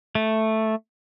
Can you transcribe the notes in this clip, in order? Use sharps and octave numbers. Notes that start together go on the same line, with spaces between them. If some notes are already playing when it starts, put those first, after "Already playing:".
A3